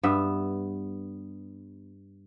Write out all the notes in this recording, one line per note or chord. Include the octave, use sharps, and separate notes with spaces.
G2 B3 E5